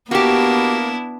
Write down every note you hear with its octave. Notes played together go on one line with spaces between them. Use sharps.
A#3 B3 D4 E4 F#4 G4